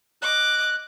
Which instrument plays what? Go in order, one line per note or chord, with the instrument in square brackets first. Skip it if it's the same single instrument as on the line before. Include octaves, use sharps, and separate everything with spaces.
[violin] D#5 D6 [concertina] F#6